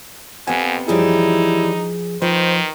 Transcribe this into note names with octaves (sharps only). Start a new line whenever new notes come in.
F2 C3 B3 F#5 G#5
F#2 E3 F3 G3 D#4 E4 G#4
D#3 F3 D#4 B4 C5